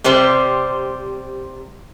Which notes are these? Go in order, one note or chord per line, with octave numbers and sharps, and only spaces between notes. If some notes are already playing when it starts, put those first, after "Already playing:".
C3 G3 G4 C5